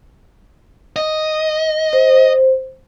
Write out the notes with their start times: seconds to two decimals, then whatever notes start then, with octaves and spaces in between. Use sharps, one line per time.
0.96 D#5
1.93 C5